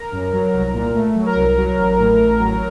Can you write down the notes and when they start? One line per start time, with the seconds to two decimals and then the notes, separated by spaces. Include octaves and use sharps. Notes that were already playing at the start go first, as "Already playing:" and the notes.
Already playing: A#4 A#5
0.12 F#2
0.33 F#3
0.54 C2
0.73 A#2
0.94 A3
1.15 F#3
1.26 A#4 A#5
1.35 C2
1.57 F#3
1.78 A1
1.98 A2
2.19 A1
2.39 F#3